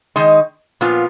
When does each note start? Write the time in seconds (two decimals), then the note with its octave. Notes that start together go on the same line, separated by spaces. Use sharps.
0.16 D#3 G#3 D#4
0.81 A#2 F3 B3 F4